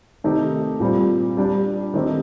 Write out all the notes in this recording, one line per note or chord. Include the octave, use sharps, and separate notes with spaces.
C3 D#3 A3 D#4 G4
A#2 G3 C4
G3 D4 G4
D#3 A3 C4 D#4 G4